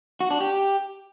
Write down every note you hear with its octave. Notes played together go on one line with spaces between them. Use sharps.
F#4
D4
G4